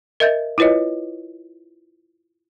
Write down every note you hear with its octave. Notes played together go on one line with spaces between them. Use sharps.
A#4 D#5 E5 G6 A6
E4 F4 B4 C#5 D#5